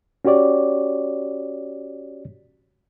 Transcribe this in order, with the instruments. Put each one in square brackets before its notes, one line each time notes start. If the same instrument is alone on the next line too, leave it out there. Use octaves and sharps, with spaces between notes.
[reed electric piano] C#4 F#4 G4 C#5 D5